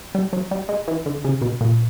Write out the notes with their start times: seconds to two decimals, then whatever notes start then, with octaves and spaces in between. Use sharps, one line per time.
0.15 G3
0.33 F#3
0.51 G3
0.69 G#3
0.88 E3
1.06 D3
1.25 C#3
1.42 B2
1.61 A#2